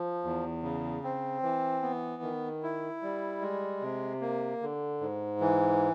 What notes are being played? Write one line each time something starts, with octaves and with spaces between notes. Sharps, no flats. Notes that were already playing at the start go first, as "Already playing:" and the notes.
Already playing: F3
E2
C#3
C4
E3
B3
D#3
E4
G3
G#3
C3
A#3
D3
G#2
E3